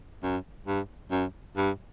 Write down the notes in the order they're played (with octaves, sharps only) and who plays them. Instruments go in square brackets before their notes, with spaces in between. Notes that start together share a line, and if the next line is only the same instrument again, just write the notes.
[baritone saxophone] F#2
G2
F#2
G2